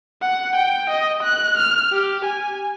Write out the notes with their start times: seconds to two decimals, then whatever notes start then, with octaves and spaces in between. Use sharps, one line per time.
0.22 F#5
0.56 G5
0.90 D#5
1.23 F#6
1.57 F6
1.93 G4
2.25 G#5